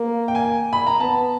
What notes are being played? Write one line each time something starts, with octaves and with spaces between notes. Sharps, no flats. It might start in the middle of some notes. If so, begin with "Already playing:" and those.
Already playing: A#3
G5
G#5
B5
A#5
B3 A5